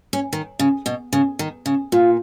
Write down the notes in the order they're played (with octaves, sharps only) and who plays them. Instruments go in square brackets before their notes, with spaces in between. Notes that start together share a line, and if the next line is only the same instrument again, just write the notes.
[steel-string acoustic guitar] C#4
D#3
C#3
B2
C#3
D#3
C#3
[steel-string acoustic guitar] A#2 [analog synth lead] F4